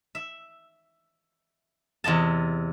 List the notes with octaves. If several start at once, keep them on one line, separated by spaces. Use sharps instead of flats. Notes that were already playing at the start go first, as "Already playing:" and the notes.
E5
E2 C3 D#5 A5